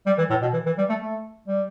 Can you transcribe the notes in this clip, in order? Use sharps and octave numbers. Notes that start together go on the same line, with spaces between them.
G3
E3
A2
B2
E3
E3
G3
A3
A3
G3